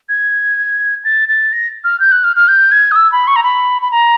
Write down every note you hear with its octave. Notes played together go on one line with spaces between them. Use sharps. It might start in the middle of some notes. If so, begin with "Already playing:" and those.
G#6
A6
A6
A#6
F6
G6
F#6
F6
F6
G6
G#6
D#6
E6
B5
C#6
A#5
B5
B5
A#5